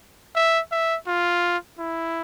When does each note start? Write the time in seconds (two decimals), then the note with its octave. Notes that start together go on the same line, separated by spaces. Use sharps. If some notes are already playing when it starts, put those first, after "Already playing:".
0.35 E5
0.72 E5
1.07 F4
1.79 E4